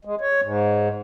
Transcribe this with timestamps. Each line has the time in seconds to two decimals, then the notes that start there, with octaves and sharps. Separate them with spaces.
0.05 G#3
0.21 C#5
0.43 G#2